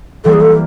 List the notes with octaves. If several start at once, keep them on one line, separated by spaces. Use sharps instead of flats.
E3 G3 A#3 A4
G#4
A4